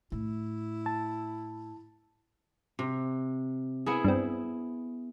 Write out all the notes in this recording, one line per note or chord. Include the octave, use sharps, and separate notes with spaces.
A2 E4
A5
C3
B3 E4 G#4
G2 C4